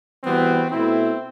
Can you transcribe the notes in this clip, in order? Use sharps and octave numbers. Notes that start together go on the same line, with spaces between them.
E3 G3 B3 C4 F#4 B4
B2 A3 C4 E4